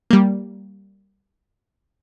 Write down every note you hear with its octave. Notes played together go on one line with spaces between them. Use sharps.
G3 A#3